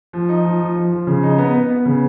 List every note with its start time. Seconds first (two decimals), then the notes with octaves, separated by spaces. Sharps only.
0.13 F3
0.29 D#4
0.44 F3
0.60 F3
0.76 F3
0.92 F3
1.07 C#3
1.23 D#4
1.38 B3
1.54 B3
1.70 B3
1.86 C#3